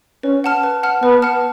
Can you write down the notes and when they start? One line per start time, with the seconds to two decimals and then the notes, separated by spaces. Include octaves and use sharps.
0.23 C#4 B4
0.44 F#5 A5 F6
0.63 B4
0.83 F#5 A5 F6
1.02 B3 B4
1.22 F#5 A5 F6